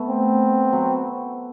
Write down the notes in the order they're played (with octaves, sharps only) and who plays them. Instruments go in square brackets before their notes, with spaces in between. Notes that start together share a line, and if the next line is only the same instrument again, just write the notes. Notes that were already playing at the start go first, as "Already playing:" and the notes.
Already playing: [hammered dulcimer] A3 B3
[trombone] C4
[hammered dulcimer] F#3